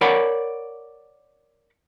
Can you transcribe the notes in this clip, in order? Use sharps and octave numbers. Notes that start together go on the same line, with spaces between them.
A#4 C#5 D5 F#5 B5